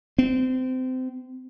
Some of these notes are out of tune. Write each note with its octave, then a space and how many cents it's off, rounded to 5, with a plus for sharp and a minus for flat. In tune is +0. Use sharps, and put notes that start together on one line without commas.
C4 -25